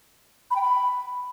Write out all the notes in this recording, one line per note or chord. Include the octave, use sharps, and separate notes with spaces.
B5
G5
B5